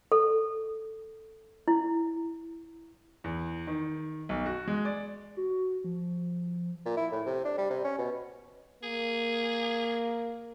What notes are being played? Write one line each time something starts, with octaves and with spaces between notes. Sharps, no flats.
A4
E4
E2
D#3
B1
F#4
G#3
D5
F#4
F3
A#2
E4
A2
C3
D4
G3
C3
C#4
B2
A#3 G#4